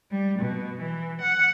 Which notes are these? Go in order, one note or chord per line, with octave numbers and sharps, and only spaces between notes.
G3
B2
E3
F#5